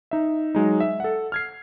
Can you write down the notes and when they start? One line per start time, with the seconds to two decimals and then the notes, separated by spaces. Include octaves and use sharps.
0.11 D#4 E5
0.55 F#3 G#3 D#4
0.80 E5
1.00 A4 F#5
1.32 F6 G#6 C7